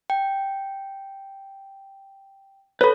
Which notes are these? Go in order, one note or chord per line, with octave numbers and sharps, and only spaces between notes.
G5
A4 B4 C#5 B5